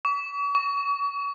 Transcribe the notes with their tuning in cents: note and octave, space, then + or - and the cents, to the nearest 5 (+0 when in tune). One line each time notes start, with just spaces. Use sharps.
C#6 +45
C#6 +35